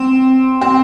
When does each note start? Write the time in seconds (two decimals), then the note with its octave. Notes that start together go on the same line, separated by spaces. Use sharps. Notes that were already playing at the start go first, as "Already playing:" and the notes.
Already playing: C4
0.61 C4